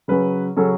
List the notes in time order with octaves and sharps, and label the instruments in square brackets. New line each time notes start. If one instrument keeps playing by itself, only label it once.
[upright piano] C#3 F#3 C#4 B4
C#3 F#3 C#4 A4